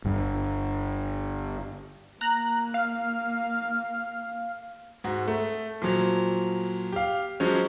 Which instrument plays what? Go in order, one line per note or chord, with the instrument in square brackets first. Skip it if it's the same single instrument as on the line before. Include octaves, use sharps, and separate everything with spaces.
[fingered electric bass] G1 G2
[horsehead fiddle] A#3 [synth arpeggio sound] A#5 F#6
[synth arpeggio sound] F5
[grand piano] G#2 F#4
A3
A#2 F3 F#3
G4 F5
F3 F#3 G#3 C#4